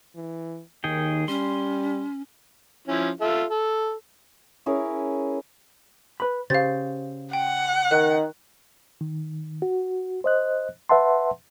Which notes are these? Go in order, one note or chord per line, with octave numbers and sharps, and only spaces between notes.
E3
D#2 D#3 G#4 G5
G3 C#4 C6
F3 C#4 E4
F4 A4 E5
A4
C#4 E4 G#4 A#4
B4 B5
C#3 G4 C5 F5 A6
F#5 G5
D#3 F#6
D#3
F#4
C5 D#5 F#6
B4 E5 F#5 A5 C6